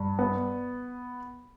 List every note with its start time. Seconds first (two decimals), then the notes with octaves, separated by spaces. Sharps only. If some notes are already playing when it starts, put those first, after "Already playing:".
Already playing: G2
0.19 B3